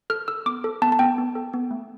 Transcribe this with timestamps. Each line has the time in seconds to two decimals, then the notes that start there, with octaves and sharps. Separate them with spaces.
0.10 A4 F6
0.28 A4 E6
0.46 B3 D6
0.64 A4
0.82 B3 A5
0.92 A5
0.99 B3 G5
1.18 B3
1.35 A4
1.54 B3
1.71 A3